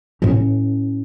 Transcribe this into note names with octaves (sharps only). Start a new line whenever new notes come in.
A2 C#4